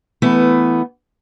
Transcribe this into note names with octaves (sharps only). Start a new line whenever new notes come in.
E3 A3 B3